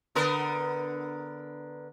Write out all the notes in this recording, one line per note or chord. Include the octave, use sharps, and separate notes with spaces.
D3 B3 A#4